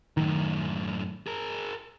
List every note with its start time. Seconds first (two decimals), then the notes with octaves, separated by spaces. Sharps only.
0.17 F#2 A2 D#3
1.27 G#4 A#4